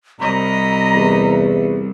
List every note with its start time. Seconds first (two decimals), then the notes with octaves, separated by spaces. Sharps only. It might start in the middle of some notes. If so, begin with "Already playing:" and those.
0.20 C2 D#5 A#5 B5
0.95 E2